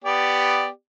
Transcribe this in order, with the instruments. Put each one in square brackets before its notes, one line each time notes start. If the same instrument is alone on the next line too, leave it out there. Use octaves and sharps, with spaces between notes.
[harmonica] B3 G4 D5